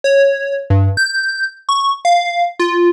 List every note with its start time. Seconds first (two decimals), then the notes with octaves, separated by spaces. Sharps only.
0.04 C#5
0.70 G2
0.97 G6
1.69 C#6
2.05 F5
2.59 F4